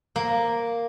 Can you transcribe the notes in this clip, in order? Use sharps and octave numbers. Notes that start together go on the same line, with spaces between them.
A#3